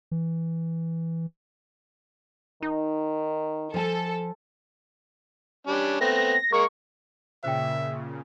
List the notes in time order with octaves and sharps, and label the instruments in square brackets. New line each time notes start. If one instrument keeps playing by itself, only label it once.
[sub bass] E3
[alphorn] D#3 [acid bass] D#4
[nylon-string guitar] F3 G#5 [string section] A4
[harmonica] G3 C#4 D4
[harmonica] A3 B3 C4 [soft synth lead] A#6
[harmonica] G#3 A#3 A#4 [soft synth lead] C#6
[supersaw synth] A#2 C#3 [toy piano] C5 G5 [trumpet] E5